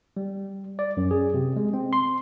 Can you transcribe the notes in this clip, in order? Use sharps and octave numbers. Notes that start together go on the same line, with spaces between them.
G3
D5
F#2
G#4
C3
G#3
C4
C6